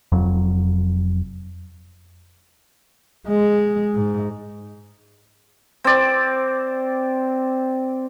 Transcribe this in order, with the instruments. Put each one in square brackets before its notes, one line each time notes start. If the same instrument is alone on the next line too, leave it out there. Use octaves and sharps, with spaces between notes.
[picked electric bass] F1 F2 F#3
[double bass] G#3
G#2
[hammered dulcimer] C4 D5